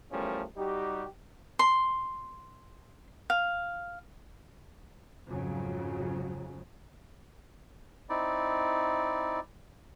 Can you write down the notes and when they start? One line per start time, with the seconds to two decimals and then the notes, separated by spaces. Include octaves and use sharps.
0.12 E2 F3 G3 A3 C#4 A#4
0.57 G3 D#4 F#4 G4
1.59 C6
3.30 F5
5.28 F2 G#2 C#3 F#3
8.09 C4 D#4 E4 D5